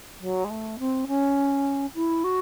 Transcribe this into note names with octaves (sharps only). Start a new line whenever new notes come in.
F#3
G#3
A3
C4
C#4
E4
F#4